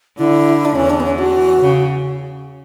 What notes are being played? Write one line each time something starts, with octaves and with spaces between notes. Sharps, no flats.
D3 E4
D4
E2 E3 C#4
D4
B3
C#4
F#4
C#3